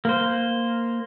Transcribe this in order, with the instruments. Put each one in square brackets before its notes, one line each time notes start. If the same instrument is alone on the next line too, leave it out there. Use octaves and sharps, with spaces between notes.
[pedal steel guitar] A#3 C5